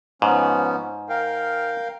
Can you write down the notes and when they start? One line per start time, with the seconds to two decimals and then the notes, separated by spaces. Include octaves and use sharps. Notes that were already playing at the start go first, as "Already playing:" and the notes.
0.22 G#2 F3 B3 C#4
1.09 A#4 F5 G5